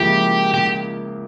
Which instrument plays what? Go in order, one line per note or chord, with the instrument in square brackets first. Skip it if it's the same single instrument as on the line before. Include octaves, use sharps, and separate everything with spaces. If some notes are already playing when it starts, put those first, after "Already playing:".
Already playing: [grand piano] C#2 C#3 F3 A#3 E4 [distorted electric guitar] G4
[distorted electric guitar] G4